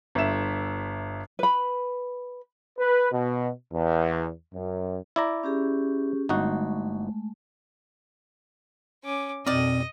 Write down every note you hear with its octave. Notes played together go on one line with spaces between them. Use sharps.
G1 G2 E5 E7
B4 B5
B4
B2
E2
F#2
E4 D5 A#5
C#4 G4 G#4
G1 G#3 A3 D#4 F#4
C#4 D6
F2 B2 D#3 C4 D5 D#5